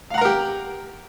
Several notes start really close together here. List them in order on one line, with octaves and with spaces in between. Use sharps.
F5 F#5 A#5 A#4 G4